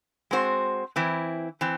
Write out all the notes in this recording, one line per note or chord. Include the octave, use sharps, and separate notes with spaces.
G#3 C4 F#4 C5
E3 C4 E4
E3 C4